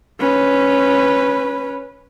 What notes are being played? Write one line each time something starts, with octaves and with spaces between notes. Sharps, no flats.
C#4 B4